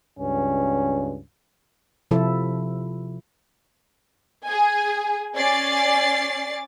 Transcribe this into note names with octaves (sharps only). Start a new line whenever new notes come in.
C#2 G2 C#4
C3 F3 E4 A4
G#4 G#5
C#4 D5 A6 C7